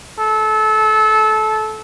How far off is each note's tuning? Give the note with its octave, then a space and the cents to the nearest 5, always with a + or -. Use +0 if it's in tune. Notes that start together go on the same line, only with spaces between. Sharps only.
A4 -25